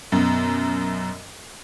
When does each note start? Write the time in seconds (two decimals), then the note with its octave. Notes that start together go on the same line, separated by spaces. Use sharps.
0.12 F#2 B2